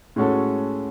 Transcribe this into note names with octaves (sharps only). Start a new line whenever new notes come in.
A2 G#3 C#4 F#4 A4